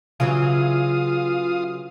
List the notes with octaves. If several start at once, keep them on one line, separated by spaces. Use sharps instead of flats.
C#3 E3 F#3 F4 F5 D#6